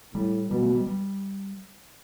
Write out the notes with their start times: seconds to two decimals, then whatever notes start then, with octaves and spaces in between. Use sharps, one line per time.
0.15 A2 G3
0.50 B2 G3
0.63 A3
0.75 G3
0.87 G3